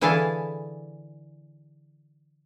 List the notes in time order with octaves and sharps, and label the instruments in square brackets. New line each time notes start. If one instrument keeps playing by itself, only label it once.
[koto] D3 E3 E4 G#4 F5 A5